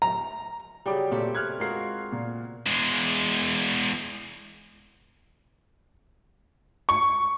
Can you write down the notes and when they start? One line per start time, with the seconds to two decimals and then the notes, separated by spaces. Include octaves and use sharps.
0.02 A#5
0.86 C#3 F#3 G3 G4 G5 D6
1.11 A#2 A3 C4 G4
1.35 F6 F#6 G#6
1.60 G#3 F4 F#4 A#4 C7
2.12 A#2
2.66 E2 G#3
6.89 C#6